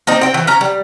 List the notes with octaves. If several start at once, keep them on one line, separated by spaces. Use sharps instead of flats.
A#3 C4 D#4
C4 G5
E3
C#4 A#5
G3